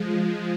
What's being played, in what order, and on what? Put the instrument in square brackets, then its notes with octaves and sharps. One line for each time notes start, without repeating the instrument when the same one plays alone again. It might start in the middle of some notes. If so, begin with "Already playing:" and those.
Already playing: [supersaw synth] F3 G#3